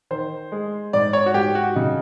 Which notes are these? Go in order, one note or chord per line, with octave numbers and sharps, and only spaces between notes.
D#3 C5
G#3
G#2 D5
C#5
F#4
G#2 G4
F#4
C#3 D#4